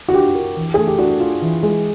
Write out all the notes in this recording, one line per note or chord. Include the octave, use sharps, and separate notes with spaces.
F#4
F4 G4
A#4
E3
A3 G#4
G4
D4 F#4
F4
E3
G#3